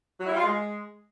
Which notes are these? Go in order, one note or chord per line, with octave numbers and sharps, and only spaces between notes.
F#3
E4
G3
F4
G#3